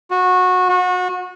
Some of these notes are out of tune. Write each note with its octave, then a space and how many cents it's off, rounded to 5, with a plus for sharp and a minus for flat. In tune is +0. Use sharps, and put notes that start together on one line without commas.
F#4 -20
F#4 -30